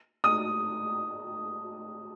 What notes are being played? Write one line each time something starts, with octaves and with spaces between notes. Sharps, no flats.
D#6